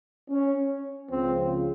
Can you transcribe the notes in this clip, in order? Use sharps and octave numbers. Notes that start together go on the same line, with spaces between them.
C#4
C#2 C#3 F3 C4